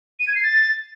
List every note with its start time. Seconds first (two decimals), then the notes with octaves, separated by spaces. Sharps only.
0.20 D#7
0.27 G#6
0.35 C7
0.43 A6